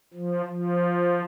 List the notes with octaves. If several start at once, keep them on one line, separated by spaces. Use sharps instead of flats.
F3
F3